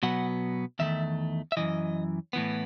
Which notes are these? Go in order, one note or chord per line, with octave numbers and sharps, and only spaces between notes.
B2 F#3 B3 F#5
E2 D#3 A3 E5
E5
F#2 C#3 E3 D#5
A2 E3 B3